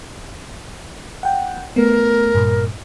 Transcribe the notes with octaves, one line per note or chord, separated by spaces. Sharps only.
F#5 G5
A3 B3 A#4
G2 A#2